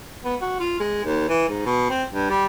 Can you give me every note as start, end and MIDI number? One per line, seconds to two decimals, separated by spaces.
0.25 0.36 59
0.42 0.57 66
0.60 0.76 65
0.80 1.00 56
1.05 1.25 39
1.29 1.47 52
1.49 1.61 44
1.66 1.89 47
1.90 2.04 60
2.13 2.30 43
2.30 2.46 55